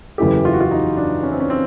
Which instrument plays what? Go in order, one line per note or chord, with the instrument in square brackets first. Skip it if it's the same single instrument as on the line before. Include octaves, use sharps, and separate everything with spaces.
[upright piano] F#1 E2 C#3 E3 A3 [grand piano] G4
[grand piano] F4
F#4
F4
D#4
D4
C#4
C4
C#4
C4